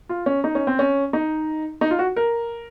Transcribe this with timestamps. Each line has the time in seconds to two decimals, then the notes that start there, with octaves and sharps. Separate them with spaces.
0.09 F4
0.26 C#4
0.44 D#4
0.55 C#4
0.67 C4
0.79 C#4
1.13 D#4
1.81 D#4
1.91 F4
1.99 F#4
2.16 A#4